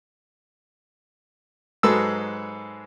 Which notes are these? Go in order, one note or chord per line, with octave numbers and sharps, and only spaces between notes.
G#2 F#3 G#3 A4 B4 E6